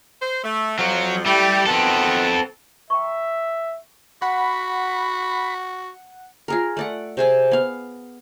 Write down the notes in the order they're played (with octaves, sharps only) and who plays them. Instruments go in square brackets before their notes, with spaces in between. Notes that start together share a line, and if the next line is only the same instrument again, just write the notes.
[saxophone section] C5
A3
[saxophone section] F2 F3 [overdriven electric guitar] F#3
[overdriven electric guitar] G3 [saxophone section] A3 E4 G4
[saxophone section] B2 D#3 B3 [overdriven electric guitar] C4 A4
[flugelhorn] E5 [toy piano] G5 A#5 C#6
[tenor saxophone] F#4 [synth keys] F#5 [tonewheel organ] B5
[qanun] F4 G#4 A#4
A3 D5 F#5
C3 G#4 G#5
B3 F5